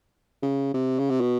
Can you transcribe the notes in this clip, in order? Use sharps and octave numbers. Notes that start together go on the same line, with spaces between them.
C#3
C3
C#3
C3
B2